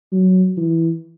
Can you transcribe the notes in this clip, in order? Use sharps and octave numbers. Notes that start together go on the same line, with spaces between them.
F#3
E3